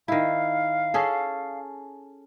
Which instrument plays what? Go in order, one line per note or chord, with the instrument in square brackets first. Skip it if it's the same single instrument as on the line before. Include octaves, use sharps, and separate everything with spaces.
[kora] D#3 E4 [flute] F5
[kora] C#4 G#4 A4